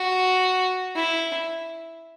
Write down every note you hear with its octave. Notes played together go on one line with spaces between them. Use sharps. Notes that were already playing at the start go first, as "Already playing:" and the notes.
Already playing: F#4
E4